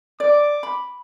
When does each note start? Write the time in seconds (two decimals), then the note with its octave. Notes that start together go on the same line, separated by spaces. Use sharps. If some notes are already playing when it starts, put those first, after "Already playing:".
0.20 D5 D6
0.63 B5